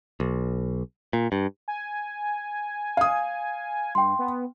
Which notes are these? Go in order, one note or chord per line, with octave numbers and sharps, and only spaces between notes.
B1
A#2
G2
G#5
F5 D#6
G2 G5 C6
B3